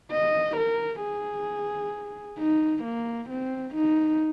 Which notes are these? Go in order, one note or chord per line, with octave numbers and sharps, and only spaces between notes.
D#5
A#4
G#4
D#4
A#3
C4
D#4